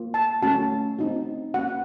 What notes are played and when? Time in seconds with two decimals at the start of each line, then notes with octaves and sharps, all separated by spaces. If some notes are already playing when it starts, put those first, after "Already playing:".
Already playing: A#3 F4
0.14 A5
0.42 A3 C#4 F#4 A5
0.99 C4 D#4 F#4
1.54 A#3 C#4 F#4 F#5